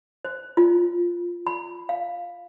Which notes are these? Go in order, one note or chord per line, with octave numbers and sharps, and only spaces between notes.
C5
F4
B5
F5